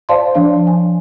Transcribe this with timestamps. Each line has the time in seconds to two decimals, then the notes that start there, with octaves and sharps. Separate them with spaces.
0.09 C5 D5 F5 A5 C6
0.35 F3 D4 F5
0.67 G#5